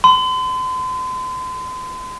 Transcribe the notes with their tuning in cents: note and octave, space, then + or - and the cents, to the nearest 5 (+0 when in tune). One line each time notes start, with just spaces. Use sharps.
C6 -40